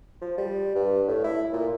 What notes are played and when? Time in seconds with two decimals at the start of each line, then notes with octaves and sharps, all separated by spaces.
0.21 F3
0.38 G3
0.75 G2
1.08 A2
1.24 E4
1.53 A#2